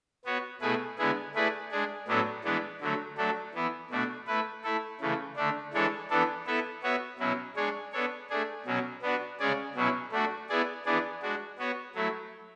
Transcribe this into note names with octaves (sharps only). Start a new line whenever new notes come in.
B3 F#4 C#5
B2 A3 E4 G#4 B4
D3 G#3 B3 E4 G#4
A3 E4 G#4 B4 D5
G#3 D4 G#4
A2 F#3 B3 D4 A4
E3 G#3 B3 D4
D3 F#3 A3
F#3 A3 D4 A4
E3 B3 E4
B2 A3 D4 F#4
A3 E4 B4
A3 E4 A4
C#3 E3 A3
D3 A3 D4
E3 G#3 D4 A4 C#5
E3 B3 D4 A4
B3 E4 A4 E5
B3 F#4 C#5 E5
B2 F#3 C#4 E4
G#3 D4 G#4 C#5
B3 D4 A4 C#5
A3 D4 G#4
B2 F#3 C#4
B3 D4 F#4
C#3 G#3 C#4 G#4 D5
B2 F#3 C#4 E4
A3 D4 F#4
B3 E4 G#4 D5
E3 B3 D4 G#4 D5
G#3 D4 F#4
B3 F#4 C#5
F#3 A3 E4